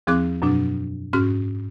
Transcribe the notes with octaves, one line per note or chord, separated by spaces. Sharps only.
E2 F3 C4 G#4 D6 F#6
F#2 B2 F#3 D4
G#2 C#4 F#4 F6